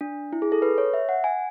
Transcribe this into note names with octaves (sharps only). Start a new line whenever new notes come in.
D4
E4
G#4
A4
B4
C#5
E5
F#5
G#5